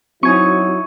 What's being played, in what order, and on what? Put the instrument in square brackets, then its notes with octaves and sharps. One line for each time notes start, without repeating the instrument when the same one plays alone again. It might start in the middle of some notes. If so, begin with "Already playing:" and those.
[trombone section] F#3 E4 [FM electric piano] C4 [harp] D#4 G#5 C#6 [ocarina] F#4